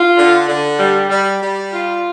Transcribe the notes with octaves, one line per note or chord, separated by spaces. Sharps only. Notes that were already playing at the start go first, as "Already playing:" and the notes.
Already playing: F4
D3
D3
G3
G3
G3
F4